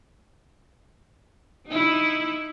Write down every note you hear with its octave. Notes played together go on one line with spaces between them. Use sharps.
D#4 E4